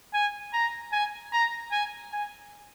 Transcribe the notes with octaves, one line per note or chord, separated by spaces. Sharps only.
G#5
A#5
G#5
A#5
G#5
G#5